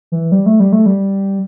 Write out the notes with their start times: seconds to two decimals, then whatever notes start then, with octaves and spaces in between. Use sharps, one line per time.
0.12 E3
0.32 G3
0.46 A3
0.60 G3
0.72 A3
0.86 G3